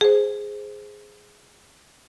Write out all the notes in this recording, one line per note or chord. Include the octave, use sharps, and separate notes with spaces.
G#4 C5